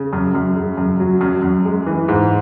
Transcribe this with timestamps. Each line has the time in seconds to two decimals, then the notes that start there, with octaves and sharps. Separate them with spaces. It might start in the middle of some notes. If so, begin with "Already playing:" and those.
Already playing: C#3
0.13 F#2
0.35 F#2
0.56 C#3
0.77 F#2
1.00 F#3
1.21 F#2
1.42 F#2
1.65 G#3
1.86 E3
2.08 G#2